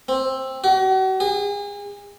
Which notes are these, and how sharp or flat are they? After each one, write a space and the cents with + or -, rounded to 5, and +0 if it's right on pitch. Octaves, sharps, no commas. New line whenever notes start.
C4 +15
F#4 +40
G#4 -35